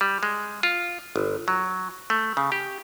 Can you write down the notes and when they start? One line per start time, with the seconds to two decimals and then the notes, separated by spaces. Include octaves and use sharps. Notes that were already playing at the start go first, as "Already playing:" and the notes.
0.01 G3
0.23 G#3
0.63 F4
1.16 G1
1.48 F#3
2.10 A3
2.37 C#3
2.52 G4